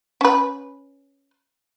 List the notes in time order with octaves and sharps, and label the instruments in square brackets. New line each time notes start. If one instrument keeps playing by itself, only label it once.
[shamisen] C#4 B4